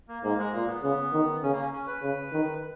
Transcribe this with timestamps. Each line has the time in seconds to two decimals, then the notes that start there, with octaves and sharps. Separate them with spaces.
0.08 A#3
0.23 G#2 A#3
0.39 G#3
0.52 A#2 A#3
0.67 B3
0.83 C#3 B3
1.13 D#3
1.43 C#3 C#4
1.52 A#3
1.62 C#4
1.72 C#4
1.87 B4
2.02 C#3
2.32 D#3